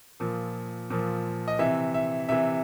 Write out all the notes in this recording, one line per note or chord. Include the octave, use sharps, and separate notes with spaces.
A#2 F3
A#2 F3
D#5
C3 E3 E5
E5
C3 E3 E5